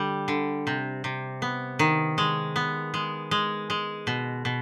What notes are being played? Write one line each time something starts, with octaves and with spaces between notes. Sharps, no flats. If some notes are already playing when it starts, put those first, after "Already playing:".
Already playing: D3 G3
D3
C3
C3
B3
D#3
G#3
B3
G#3
G#3
G#3
B2
B2